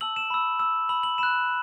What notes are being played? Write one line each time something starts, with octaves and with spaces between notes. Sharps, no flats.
A5 E6 F#7
E7
B5 E6
B5 E6
B5 E6 F#7
F#7
B5 F#6 E7